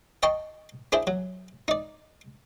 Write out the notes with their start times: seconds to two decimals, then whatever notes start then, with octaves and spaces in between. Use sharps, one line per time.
0.23 D#5 G5 A5 C6 C#6
0.92 D4 E4 G#4 C5
1.07 F#3
1.68 D#4 D5